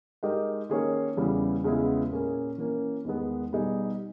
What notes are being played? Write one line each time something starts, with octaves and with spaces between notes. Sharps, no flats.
G#3 D#4 G4 A#4 D#5
D#3 A#3 C#4 G#4 C#5
E2 C#3 E3 G3
E2 C#3 G#3 B3 E4
A#2 A#3 C#4 G#4
E3 A#3 C#4
E2 D#3 G#3 B3
B2 G3 B3 D#4 G#4